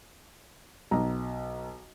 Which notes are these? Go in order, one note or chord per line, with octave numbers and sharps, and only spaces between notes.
B1 A#5